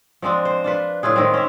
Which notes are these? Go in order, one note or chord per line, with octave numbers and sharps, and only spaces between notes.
F3 G#3 C4 D4
C5
D4 F4 B4
A2 E4 F4 G#4
D#3 G#3 C4
C#4 E5